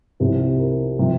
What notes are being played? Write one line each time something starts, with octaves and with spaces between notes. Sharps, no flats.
C2 C3 F3 C4
A#4
C3 F3